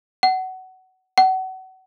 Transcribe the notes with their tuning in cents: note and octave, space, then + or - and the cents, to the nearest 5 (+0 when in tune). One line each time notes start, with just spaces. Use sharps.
F#5 +20
F#5 +30